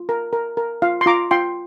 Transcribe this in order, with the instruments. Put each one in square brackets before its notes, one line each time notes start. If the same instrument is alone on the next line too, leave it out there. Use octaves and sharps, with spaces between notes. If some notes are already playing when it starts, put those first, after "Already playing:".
Already playing: [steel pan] F4
A#4
A#4
A#4
F4 F5
C6
F4 A#5 D6
F4 G5 C6